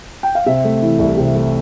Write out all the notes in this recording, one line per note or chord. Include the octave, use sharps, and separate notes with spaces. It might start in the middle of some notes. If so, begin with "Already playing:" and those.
G5
F5
C3 E5
A3
E3
C2
C3
A3